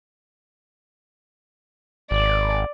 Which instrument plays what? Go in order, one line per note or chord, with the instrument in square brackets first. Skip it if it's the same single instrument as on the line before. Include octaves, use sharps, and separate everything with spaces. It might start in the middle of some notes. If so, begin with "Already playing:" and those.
[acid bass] G#1 [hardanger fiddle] D5